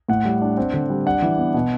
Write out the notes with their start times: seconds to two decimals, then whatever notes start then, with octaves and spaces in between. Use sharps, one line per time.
0.09 A2 F#5
0.25 G3
0.42 D4
0.57 C4
0.73 D3
0.90 G3
1.06 D4 F#5
1.22 E3
1.38 B3
1.54 B2